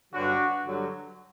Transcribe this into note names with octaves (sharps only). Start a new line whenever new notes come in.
G2 D3 F#3 D4 F#4
G2 D3 F#3